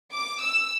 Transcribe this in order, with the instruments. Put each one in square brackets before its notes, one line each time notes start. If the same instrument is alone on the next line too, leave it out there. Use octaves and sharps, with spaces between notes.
[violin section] D6
E6